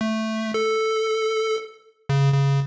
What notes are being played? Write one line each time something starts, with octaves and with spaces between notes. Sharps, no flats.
A3
A4
C#3
C#3